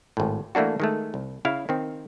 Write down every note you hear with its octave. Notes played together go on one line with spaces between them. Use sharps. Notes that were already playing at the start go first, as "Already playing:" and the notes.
G#1 A2
E3 A3 A#3 D4 F#4
D#3 G#3 A3
C2
C#3 E4 F5
D#3 C4